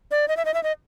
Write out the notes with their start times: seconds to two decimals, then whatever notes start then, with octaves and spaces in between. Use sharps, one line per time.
0.11 D5
0.28 D#5
0.37 E5
0.45 D#5
0.54 E5
0.63 D#5